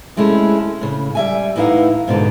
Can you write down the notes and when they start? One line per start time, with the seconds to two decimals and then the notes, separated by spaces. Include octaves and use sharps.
0.17 C3 G#3 A3 C#4 E4
0.81 A2 C#3
1.15 G3 E5 G#5
1.56 A2 E3 D#4 E4 F5 F#5
2.08 G#2 B2 D3